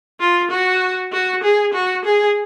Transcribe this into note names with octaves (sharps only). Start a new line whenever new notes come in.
F4
F#4
F#4
G#4
F#4
G#4